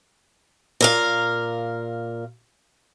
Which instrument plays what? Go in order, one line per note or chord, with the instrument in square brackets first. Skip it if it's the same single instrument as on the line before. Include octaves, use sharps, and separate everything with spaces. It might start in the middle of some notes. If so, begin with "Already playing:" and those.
[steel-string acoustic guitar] A#2 A#4 F5